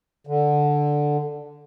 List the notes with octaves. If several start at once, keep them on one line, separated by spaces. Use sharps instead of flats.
D3